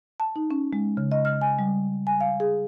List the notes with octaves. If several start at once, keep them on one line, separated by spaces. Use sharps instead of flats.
A5
D#4
C#4
G#3
C#3
D#5
F6
G#5
G3
G#5
F5
G#4